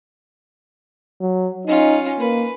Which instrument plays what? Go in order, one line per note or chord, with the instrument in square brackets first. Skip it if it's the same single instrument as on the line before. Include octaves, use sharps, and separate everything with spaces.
[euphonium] F#3
[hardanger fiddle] C#4 F4 [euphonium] D#4
[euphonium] A#3 [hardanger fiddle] B4